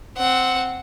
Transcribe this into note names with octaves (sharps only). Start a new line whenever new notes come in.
C4 F#5